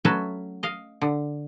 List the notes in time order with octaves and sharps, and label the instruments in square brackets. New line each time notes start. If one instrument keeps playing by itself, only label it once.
[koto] F#3 A3 C#4 F#4 B4 E5
D#5 F5
D3